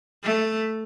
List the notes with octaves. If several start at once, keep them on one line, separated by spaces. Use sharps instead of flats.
A3